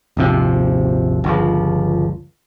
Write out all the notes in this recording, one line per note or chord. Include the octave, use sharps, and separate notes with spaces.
D#1 G#1 C3 F3
G1 C#2 F3